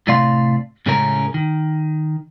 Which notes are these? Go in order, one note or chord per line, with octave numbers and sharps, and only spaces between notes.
A2 C3 A3 D5 F5 C6
A2 C#3 G#3 A3 C#4 A#4
D#3